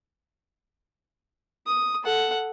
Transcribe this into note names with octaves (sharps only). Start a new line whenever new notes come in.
D#6
A4 F#5